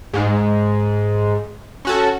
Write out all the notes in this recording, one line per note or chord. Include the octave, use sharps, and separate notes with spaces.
G#2 G#3
C#4 F#4 A4